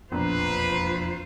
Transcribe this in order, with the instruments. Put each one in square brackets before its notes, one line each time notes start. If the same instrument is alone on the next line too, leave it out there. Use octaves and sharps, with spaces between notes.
[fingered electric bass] E1 F2 B3 [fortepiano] A#1 [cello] F4 C5 [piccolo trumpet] B4